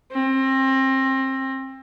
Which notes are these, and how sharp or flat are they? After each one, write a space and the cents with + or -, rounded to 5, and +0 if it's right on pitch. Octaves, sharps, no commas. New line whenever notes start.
C4 +30